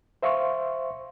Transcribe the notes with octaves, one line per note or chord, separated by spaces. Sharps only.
C5 E5 F5 C6 C#6